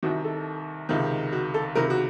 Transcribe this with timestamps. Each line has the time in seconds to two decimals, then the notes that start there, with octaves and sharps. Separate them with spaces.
0.03 C2 C3 D#3 F#4
0.25 A4
0.89 C#2 C3 D#3
1.32 F#4
1.54 A4
1.75 C#2 C3 D#3 A#4
1.90 F#4